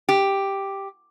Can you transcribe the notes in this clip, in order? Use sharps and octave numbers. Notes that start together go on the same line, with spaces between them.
G4